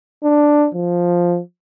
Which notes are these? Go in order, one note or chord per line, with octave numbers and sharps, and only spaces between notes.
D4
F3